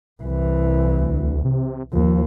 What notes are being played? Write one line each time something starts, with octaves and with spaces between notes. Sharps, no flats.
C2 E3
D2
C3
D#2 F3